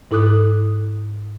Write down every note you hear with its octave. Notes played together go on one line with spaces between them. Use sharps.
G#2 E4 A4 D6 D#6 F#6